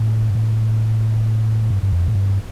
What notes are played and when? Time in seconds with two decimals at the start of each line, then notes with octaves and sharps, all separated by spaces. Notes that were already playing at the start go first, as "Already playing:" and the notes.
Already playing: A2
0.30 G2
0.35 A2
1.70 G2
1.83 G2
1.93 F2
2.08 A2
2.15 G2